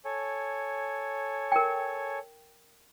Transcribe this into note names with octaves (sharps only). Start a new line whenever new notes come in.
A4 C#5 G#5
A#4 G5